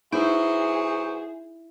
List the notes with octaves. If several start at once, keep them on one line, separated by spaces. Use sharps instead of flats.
F#3 B3 D#4 E4 G#4 C5